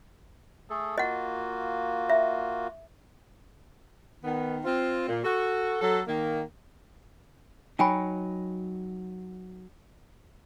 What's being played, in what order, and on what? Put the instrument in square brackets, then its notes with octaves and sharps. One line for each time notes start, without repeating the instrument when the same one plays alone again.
[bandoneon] A3 G#4 A4
[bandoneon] A#3 F4 F#4 [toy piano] D#5 F#5
[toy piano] E5
[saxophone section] D#3 B3
C4 F4
A#2
F#4 A4
F#3 A4
D#3 A#3
[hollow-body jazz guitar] F#3 D#4 [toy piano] G5 G#5 B5